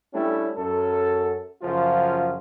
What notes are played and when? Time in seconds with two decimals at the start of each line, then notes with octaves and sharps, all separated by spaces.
0.13 G3 A3 C#4 D4 E4 G4
0.56 F#2 A4
1.62 F#2 C#3 F3 F4